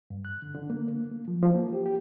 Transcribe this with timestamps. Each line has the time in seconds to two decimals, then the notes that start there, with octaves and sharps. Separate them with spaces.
0.10 G2
0.25 F#6
0.42 D3
0.54 D3
0.70 A#3
0.88 A#3
1.12 A#3
1.28 F3
1.42 F3
1.55 A#3
1.73 G4
1.86 G4